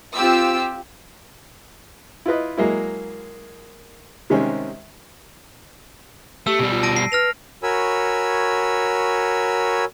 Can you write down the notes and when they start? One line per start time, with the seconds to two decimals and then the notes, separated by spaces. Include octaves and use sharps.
0.14 C4 F4 G4 E6
2.26 E4 F4 B4 D#5
2.57 F#3 G#3 A#3 E4
4.30 C3 D#3 G3 G#3 C4 C#4
6.47 A3 G4 E6
6.59 B2 G3
6.71 F4
6.83 A5 A#6 D7
6.96 C7
7.12 B4 F6 A#6 F7
7.63 F#4 A#4 C#5 G#5 B5 E6